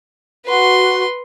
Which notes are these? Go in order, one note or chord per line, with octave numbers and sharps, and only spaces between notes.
F#4 B4 C6